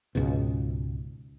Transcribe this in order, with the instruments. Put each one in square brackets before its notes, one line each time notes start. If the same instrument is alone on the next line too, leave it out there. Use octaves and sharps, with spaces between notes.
[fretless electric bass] C#2 G#2 B2